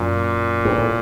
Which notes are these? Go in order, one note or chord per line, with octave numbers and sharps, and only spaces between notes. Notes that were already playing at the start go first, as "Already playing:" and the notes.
Already playing: F#2 A#2
G2
A2